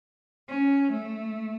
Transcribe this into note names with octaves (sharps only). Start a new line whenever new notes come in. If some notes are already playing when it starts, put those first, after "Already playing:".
C#4
A3